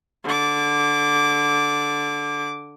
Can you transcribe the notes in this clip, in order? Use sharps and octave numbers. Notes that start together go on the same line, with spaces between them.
D3 D6